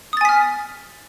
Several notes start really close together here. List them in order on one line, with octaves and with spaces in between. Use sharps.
D#6 A6 G#5 B6 F6